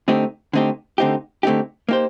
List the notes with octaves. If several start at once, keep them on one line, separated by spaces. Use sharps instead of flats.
D3 A3 C4 D#4 G4
D3 A3 C4 D#4 G4
D3 A3 C4 D#4 G4
D3 A3 C4 D#4 G4
A#3 D#4 G4 C5